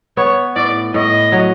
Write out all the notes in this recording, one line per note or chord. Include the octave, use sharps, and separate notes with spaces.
B3 C#5
A2 D5
A2 D#5
F#3